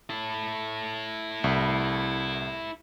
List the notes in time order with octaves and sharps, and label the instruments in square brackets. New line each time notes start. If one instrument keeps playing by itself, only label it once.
[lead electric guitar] E4 A4
[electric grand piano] C2